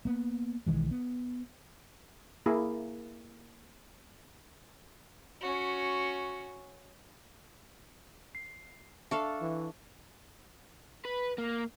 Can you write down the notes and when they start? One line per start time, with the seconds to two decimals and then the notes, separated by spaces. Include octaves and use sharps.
0.05 A#3 B3
0.66 B1 D#3 E3 G#3
0.91 B3
2.46 A#3 E4 G#4
5.41 C#4 F#4
8.35 C7
9.11 D4 A4 E5 F5 C#6
9.41 E3
11.05 B4
11.38 A#3